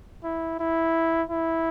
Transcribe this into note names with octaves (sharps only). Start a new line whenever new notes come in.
E4
E4
E4